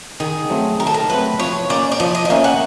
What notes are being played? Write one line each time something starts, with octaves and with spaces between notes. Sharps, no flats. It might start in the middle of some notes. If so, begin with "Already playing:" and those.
D#3 G#4
F#3 A3 C4
D#3 A#4
A4
A#4
F#3 A3 C4 B4
F3 C#5
A#3 C#4 D5
D5
F3 D#5
D#5
D#5
A#3 C#4 E5
F#5